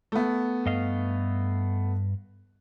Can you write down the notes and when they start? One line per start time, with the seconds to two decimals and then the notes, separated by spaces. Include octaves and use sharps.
0.12 A3 B3
0.66 G2 D#5 F5